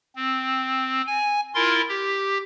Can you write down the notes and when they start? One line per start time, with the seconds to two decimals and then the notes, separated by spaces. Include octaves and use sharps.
0.15 C4
1.07 G#5
1.55 E4 F4 A#4 C6
1.89 G4